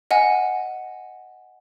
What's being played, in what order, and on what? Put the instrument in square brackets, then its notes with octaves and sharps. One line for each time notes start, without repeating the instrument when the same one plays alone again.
[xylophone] D#5 F#5 G#5